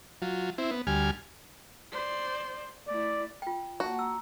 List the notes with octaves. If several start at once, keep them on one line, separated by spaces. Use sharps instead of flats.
F#3 F4
C4 E4
B3
D2 G3 G#5 F6
C5 D5
A3 E4 D5
F4 G5
A#3 F#4 F#5 A5
A#5 E6